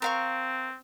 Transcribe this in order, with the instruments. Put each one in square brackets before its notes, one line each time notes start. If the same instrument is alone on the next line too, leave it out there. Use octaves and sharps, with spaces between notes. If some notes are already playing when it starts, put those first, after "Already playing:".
[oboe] C4 [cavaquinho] A#4 F5 C#6